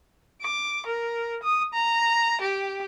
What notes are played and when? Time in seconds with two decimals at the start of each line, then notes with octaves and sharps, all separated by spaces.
0.42 D6
0.86 A#4
1.43 D#6
1.74 A#5
2.41 G4